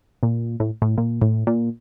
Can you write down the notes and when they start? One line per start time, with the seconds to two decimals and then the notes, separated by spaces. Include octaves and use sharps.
0.23 A#2
0.60 A2
0.82 A2
0.98 A#2
1.22 A2
1.47 A#2